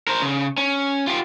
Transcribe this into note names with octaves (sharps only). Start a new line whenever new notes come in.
A#4 C5
C#3
C#4
F4 G4